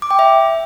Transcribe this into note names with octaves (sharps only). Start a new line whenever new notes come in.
D6
G5
E5